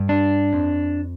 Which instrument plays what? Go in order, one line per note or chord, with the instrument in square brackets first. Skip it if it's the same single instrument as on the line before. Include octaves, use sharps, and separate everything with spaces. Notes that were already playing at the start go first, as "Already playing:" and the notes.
Already playing: [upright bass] G2
[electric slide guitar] D4
[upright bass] F2